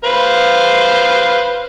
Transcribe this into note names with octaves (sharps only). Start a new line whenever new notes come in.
B4 C5 F5